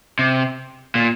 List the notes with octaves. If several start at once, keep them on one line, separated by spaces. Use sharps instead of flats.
C3
A#2